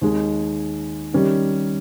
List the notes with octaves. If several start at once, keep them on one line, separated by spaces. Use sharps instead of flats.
D#2 D#3 G#3 D#4 G#4
D#3 G3 C#4